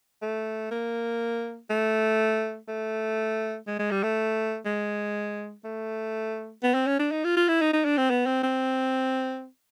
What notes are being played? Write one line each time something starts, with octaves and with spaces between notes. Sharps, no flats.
A3
A#3
A3
A3
G#3
G#3
G3
A3
G#3
A3
B3
C4
C#4
D4
D#4
F4
F4
E4
D#4
D#4
D4
C4
B3
C4
C4